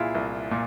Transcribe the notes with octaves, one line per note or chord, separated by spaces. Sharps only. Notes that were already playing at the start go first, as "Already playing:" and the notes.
Already playing: C2 A#2 E4 F4 G#4
C2
A#2